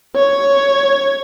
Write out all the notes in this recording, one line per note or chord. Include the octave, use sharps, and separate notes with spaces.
C#5